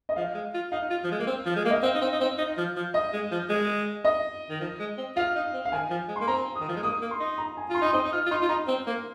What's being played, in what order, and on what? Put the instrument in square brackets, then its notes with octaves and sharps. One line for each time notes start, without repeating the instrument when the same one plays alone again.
[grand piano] D#5
[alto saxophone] F3 [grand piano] F5
[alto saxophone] G#3
F4
[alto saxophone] D#4 [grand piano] F5
[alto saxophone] F4
F3
G#3
A#3
C4
F3
G#3
A#3
[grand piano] D#5
[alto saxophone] C4 [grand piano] F5
[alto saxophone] D#4
C4
D#4
C4
D#4
F3
F3
[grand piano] D#5
[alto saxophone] G#3
F3
G#3
[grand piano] D#5
[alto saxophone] D#3
F3
G#3
C4
[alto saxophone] F4 [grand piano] F5
[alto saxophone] D#4
C4
[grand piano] F5
[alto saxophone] D#3 [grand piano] G#5
[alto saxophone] F3
G#3
[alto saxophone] A#3 [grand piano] C6
[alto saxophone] C4 [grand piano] A#5
[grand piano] D#6
[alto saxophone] D#3
F3
G#3
[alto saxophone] A#3 [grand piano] D#6
[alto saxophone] A#3
[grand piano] C6
[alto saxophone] D#4
[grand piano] A#5
G#5
[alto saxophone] F4 [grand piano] C6
[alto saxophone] D#4 [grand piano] C6
[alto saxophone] C4 [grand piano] D#6
[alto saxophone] D#4
[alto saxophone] F4 [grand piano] F6
[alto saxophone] F4
[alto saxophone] D#4 [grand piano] C6
[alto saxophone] F4
[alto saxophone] D#4 [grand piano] A#5
[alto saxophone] C4
A#3